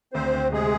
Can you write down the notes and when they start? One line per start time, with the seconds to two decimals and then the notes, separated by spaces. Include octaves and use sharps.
0.13 D2 C4 C5
0.34 D2
0.52 C3 G#3 G#4